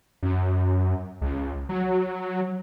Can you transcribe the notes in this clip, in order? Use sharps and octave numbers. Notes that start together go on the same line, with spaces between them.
F#2
C#2
F#3